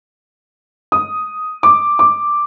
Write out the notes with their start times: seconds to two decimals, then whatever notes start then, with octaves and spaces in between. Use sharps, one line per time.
0.92 D#6
1.63 D6
1.99 D6